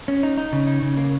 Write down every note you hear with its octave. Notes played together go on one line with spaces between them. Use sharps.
C#4
D#4
D#4
C#3
D#4
C#3
A#3